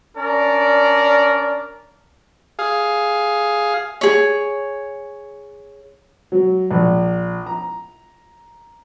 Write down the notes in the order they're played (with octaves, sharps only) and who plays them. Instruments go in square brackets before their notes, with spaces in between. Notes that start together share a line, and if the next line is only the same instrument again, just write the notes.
[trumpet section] C#4 D4 A#4 D5
[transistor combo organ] G#4 F5
[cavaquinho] G#4 C#5
[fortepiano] F#3
A#1
A#5